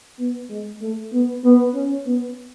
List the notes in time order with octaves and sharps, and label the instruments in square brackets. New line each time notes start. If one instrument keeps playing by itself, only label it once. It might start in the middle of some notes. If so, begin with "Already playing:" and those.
[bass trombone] B3
G#3
A3
B3
B3
C#4
B3